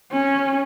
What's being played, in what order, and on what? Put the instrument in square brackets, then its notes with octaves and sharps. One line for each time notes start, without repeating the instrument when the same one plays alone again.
[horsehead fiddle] C#4